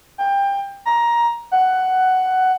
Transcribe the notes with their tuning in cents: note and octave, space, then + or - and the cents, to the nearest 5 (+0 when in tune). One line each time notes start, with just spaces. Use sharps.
G5 +25
A#5 +15
F#5 +10